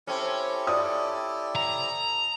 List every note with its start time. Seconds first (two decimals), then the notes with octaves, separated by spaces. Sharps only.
0.07 C4 C#4 E4 G4 A4
0.67 D5 D#6
1.56 A#5